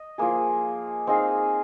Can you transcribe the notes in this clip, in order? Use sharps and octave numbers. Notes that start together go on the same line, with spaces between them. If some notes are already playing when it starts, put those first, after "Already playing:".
Already playing: D#5
F3 A#3 G#4
C4 D#4 G#4 F5